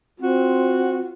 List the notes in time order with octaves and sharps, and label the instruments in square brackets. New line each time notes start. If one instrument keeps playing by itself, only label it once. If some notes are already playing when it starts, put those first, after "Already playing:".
[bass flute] C4 [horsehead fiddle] F4 [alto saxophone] F#4